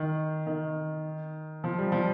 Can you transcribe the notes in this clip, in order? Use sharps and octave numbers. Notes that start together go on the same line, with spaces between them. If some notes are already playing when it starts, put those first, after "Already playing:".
Already playing: D#3
D#3
F3
G3
F3